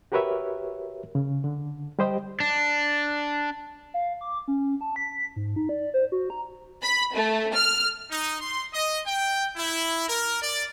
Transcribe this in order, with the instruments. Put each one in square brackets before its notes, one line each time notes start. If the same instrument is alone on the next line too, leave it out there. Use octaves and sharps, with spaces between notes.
[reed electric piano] F#4 G4 A#4 B4 C#5 E5
C#3
D3
G3 G4 C5 D#5 G5
[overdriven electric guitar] D4
[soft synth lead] F5
D6
C#4
A5
B6
G#2
D#4
D5
C5
F#4
A#5
[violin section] B5
A3
F6
[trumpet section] D#4
C6
D#5
G5
E4
A#4
D5